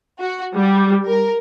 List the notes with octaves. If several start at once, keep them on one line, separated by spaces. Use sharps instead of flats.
F#4
G3
A#4